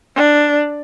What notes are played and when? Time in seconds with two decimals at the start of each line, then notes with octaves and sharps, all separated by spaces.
0.16 D4